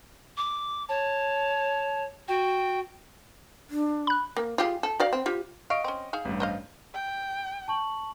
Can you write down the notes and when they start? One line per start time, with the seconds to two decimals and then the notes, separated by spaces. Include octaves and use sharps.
0.37 D6
0.88 C#5 A5
2.28 F#4 G5
3.70 D4
4.07 B5 F#6
4.37 A#3
4.58 F4 G4 G#4
4.83 A4
5.00 F#4 D5 F5
5.13 C4
5.26 F4 G4
5.70 D#5 F5 C#6 D7
5.84 C4 C#4
6.13 D#4 G#4 F5
6.25 A1 G2
6.40 C5 D#5 F5
6.94 G5
7.68 A5 C#6 F#7